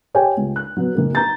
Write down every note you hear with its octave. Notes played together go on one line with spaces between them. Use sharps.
G4 C#5 G5 G#5
C#2
F#6
F#3 B3
F#1 A#3 A#4
A#5 G6 A6